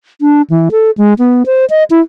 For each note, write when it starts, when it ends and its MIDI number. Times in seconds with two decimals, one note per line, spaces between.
0.21 0.42 62
0.50 0.69 52
0.71 0.91 69
0.98 1.14 56
1.19 1.43 59
1.46 1.65 72
1.70 1.84 75
1.90 2.00 64